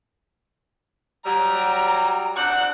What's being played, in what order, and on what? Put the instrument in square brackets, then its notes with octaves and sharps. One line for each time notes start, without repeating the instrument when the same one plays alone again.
[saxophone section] F#3 G3 [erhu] A#5
[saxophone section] C4 D4 F#5 [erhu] F#6